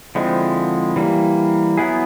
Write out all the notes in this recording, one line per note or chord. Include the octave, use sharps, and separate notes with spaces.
D3 F3 G#3 C4 E4
E3 G3 A#3
F#3 B3 E4 G#4